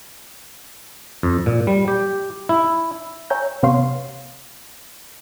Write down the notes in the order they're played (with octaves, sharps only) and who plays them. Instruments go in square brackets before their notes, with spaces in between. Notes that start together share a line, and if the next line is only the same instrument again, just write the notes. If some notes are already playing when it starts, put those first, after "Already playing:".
[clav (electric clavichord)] F2
A#2
G3
G4
E4
[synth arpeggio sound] C#5 E5 G5 G#5 A#5 G6
C3 B3 C#5 F5 C6 C7